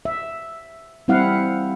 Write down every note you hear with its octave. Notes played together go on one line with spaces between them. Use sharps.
E5
G3 C4 E4 F5 F#5